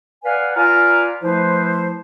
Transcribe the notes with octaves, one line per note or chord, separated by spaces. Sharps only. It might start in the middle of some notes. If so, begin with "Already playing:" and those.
B4 D5 F5 F#5 G#5
F4 B4 D5 F5 G#5 A#5
F3 A3 E4 B4 C5